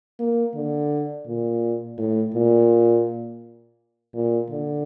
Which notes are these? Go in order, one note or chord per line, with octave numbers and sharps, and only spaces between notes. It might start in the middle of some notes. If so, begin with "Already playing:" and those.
A#3
D3
A#2
A2
A#2
A#2
D3